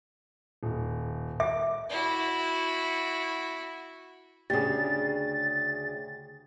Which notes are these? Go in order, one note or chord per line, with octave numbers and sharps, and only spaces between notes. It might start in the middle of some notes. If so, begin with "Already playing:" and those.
D#1
E5 D6
E4 F#4
D2 C#3 G4 G#4 A6